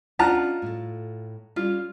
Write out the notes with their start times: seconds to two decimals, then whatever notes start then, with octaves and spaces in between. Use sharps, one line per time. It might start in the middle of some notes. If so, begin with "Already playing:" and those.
0.19 C#4 D4 F4 D#5 F#5 A5 A#5
0.62 A2 A4
1.56 G3 C#4 F4